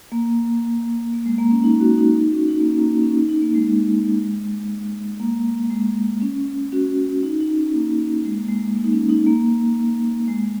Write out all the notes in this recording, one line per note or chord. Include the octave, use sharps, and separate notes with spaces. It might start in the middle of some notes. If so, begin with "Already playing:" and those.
A#3
A#3
G#3
A#3
C#4
D#4
C#4 F#4
D#4
D#4
C#4 F#4
D#4
A#3
C#4
A#3
A#3
C#4
D#4
D#4
A#3
G#3
G#3
A#3
G#3
C#4
C#4 F#4
D#4
D#4
C#4
A#3
G#3
A#3
G#3
A#3
D#4
C#4
D#4
A#3
G#3